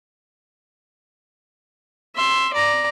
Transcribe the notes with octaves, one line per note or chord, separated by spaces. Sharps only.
E5 C6
D5 A#5